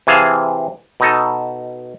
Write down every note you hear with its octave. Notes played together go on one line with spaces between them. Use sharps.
C3 E3 G#4 F5 A5
B2 D#4 A4